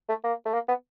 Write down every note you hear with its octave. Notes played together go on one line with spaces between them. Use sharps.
A3
A#3
A3
A#3
B3